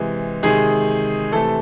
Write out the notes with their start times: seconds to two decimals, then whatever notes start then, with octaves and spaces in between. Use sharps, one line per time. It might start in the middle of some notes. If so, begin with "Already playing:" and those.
Already playing: C3 E3 G#3
0.43 C3 D#3 G#3 G#4
1.32 C3 E3 A3 A4